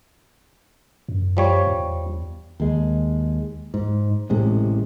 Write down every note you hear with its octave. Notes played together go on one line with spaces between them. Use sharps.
F#2
F3 G3 C#5
E2
D#2 G#3
G#2
A1 A2 C3 G#3